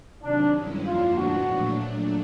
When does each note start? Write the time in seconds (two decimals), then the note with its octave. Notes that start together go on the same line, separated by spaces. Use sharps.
0.21 C3 D#3 F#3 D4
0.53 G2 D#3 G#3 C#4 E4
0.85 F2 D3 F3 A#3 D4 F4
1.17 A2 F3 G#3 B3 D4 F#4
1.48 A#2 F#3 A3 D4